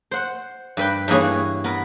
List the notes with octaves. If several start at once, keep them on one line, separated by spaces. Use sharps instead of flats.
C5 F#5
G2 B4 G5
G2 E3 A#3 G#4 C#5
B3 A#4